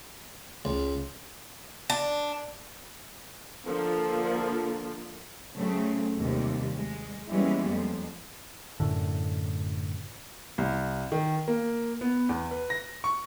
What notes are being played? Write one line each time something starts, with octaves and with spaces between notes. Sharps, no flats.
C#2
D4
D3 F3 A#3
C#3 F#3 A3 C4
D#2 C3 G3
G#3
E3 G3 G#3 A#3 B3 C#4
F2
F#2 A2 D3
C2
D#3
A#3
B3
E2
B4
A#6
C#6